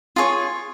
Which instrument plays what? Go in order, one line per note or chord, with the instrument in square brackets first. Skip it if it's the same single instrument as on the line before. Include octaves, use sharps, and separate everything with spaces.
[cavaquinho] F4 G#4 C#5